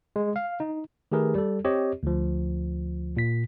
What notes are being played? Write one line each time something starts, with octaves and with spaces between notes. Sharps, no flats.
G#3
F5
D#4
D#3 A3 G4 G#4 A#4 B4
G3 A4
C4 G4 C#5 D#5
D2 F3
A#2 B6